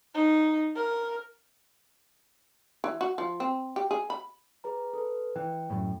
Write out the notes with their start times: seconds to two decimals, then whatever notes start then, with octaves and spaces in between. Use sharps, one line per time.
0.14 D#4
0.75 A#4
2.84 E3
3.01 F#4
3.18 F3
3.40 C4
3.76 G4
3.91 G#4
4.10 B5
4.64 G#4 B4 A#5
4.94 A4 B4
5.36 E3 G5
5.70 F#2 A2